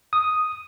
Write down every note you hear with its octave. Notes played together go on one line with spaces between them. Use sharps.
D#6